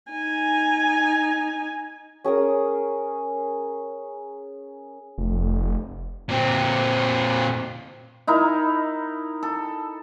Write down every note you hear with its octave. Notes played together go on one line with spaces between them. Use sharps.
D#4 G#5
C#4 G#4 A#4 D#6
F1
A#2 C4
D#4 E4 A#4
A4